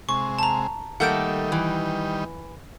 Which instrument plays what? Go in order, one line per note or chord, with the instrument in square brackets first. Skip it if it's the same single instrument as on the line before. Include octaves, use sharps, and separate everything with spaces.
[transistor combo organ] C3 G#3 [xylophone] C#6
[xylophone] A5 A#5
[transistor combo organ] D#3 G3 [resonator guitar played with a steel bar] A3 A#3 A4 [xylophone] F#5 G6 D7
[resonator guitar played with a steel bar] E3